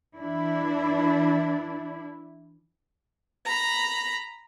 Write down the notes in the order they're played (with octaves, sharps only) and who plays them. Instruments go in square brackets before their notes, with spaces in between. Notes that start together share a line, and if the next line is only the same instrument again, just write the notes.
[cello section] E3 D4 E4
[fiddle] A#5 B5